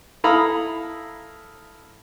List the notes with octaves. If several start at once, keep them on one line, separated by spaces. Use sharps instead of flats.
E4 A4 F5 A#5 B5 D#6